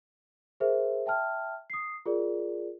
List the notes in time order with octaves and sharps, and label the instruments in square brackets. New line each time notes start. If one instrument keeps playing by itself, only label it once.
[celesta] G#4 A#4 C5 E5
E5 G5 A5 F6
D#6 C7
F4 G#4 A#4 D5